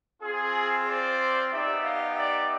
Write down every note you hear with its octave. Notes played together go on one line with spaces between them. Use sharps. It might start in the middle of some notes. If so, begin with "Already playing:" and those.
C4 F4 G#4
C5 D5
B3 D#4 G4 D5 E5
D#5 F5
D5 E5